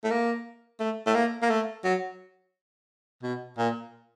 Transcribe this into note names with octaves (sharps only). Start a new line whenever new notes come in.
A3
A#3
A3
A3
A#3
A#3
A3
F#3
B2
A#2